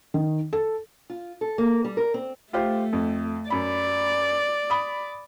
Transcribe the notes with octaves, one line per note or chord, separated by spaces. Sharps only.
D#3
A4
F4
A4
A#3
G3
A#4
C4
A3 F4 G4 C5
F2
F#2 D5 B5
B5 D#6